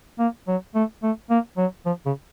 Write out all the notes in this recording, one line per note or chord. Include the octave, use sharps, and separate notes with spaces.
A#3
F#3
A3
A3
A#3
F#3
F3
C#3